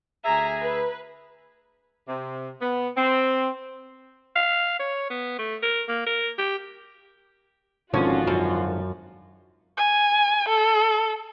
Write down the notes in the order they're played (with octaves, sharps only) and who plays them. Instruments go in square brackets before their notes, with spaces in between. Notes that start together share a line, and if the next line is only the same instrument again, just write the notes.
[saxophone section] D2 G#4 E5 [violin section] G#5 A#5
[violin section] B4
[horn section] C3
B3
C4
[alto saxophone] F5
C#5
B3
A3
A#4
A#3
A#4
G4
[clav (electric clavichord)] G#1 D3 F3 [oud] C#4 [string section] F4 F#4
[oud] F#2
[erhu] G#5
A4